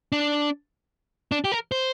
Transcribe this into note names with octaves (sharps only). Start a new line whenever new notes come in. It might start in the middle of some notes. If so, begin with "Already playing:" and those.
D4
D4
G4
A#4
C5